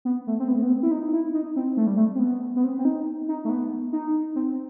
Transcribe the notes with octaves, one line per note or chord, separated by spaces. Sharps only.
B3
A3
C4
B3
A3
B3
C4
E4
D#4
E4
D#4
C4
A3
G3
A3
C4
B3
B3
C4
C4
D#4
D#4
A3
B3
D#4
C4